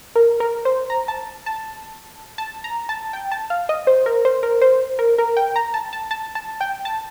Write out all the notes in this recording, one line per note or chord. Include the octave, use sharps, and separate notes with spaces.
A#4
A#4
C5
A#5
A5
A5
A5
A#5
A5
G5
A5
F5
D#5
C5
A#4
C5
A#4
C5
A#4
A#4
G5
A#5
A5
A5
A5
A5
G5
A5